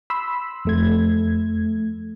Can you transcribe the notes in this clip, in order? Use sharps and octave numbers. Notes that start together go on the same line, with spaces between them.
B5 C6 E6
F2 A3 G#6